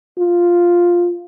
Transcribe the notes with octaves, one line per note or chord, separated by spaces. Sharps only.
F4